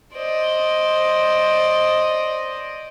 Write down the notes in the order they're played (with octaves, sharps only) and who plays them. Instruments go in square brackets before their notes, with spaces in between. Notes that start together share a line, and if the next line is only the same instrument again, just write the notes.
[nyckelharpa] C5 [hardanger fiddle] D5 D#5